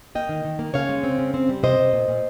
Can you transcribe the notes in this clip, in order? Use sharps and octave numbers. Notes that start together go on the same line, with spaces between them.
A#3 D#5 G5
D#3
D#3
A#3
C#3 C#5 F5
G#3
C4
C#3
C4
G3
C3 C5 D#5
C3
A#2
A#2